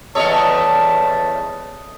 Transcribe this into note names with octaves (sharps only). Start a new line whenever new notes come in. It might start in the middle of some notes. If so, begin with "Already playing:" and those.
E2 G3 A3 A4 C#5 D#5 A5